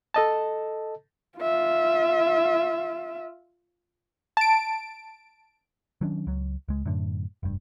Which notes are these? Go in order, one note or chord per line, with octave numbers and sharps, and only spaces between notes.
A4 D#5 A5
F4 E5
A5 D7
D#3 F#3 C#4 D4
C#2 F#3
C#2 G#3
F#2 A2 D3
F1 G2